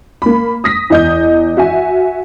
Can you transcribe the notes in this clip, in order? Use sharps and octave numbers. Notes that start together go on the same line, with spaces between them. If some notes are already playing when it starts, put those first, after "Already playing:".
A#3 B5
D#6 A#6 B6
E2 D#5 G6
F#4 E5 G#5